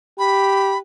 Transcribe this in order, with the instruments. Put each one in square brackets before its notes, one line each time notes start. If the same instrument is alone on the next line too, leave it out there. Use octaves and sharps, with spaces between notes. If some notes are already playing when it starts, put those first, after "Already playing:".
[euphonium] G4 [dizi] B5